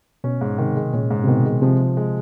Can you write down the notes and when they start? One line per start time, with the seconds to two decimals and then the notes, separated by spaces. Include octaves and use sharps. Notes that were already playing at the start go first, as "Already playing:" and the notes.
0.24 B2 C#4
0.41 G#2
0.58 C3 D#3
0.76 G#3
0.93 A#2 C#4
1.11 G#2
1.24 C3
1.28 B2 D#3
1.45 G#3
1.62 C3 F3
1.80 F3
1.97 G#3